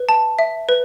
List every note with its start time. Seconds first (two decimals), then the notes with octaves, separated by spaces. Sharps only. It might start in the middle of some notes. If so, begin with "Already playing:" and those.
Already playing: B4
0.09 A5
0.39 E5
0.69 B4